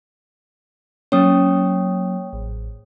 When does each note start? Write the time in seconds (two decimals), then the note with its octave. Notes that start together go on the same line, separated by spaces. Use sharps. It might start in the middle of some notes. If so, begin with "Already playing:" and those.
1.12 F#3 A#3 C#4 C#5 G5 D#6
2.33 A1